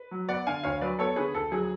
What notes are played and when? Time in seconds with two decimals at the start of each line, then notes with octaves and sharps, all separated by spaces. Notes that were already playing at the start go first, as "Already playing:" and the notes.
Already playing: B4
0.11 F#3
0.28 B3 D5 F#5
0.47 D3 F5 G#5
0.64 D2 C#5 F5
0.81 F#3 B4 D5
0.99 B3 A4 C#5
1.16 D3 G#4 B4
1.34 D2 A4
1.51 F#3 G#4